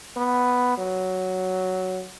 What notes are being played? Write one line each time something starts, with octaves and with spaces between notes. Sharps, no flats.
B3
F#3